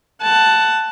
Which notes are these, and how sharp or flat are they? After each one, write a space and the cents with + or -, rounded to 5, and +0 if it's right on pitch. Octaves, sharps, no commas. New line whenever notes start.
F#5 +10 A5 +0